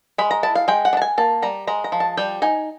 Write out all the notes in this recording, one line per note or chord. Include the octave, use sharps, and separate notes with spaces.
G#3 B5
A#5
E4 A5
F5
G#3 G5
F#5
D4
A5
G#5
A#3 A5
G3 A#5
G#3 A#5
A#5
F3
A5
G3 G5
D#4 G#5